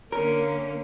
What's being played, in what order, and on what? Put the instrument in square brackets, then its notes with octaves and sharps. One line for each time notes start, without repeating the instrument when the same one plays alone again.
[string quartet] D3 C#4 [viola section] A#3 [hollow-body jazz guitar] A#4